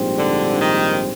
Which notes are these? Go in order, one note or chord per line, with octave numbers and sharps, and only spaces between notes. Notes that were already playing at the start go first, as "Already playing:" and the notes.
Already playing: A#1 G#2 G3 C4
D3
D#3